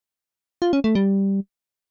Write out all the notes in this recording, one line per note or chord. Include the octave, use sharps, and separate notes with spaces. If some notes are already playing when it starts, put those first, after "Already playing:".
F4
C#4
A3
G3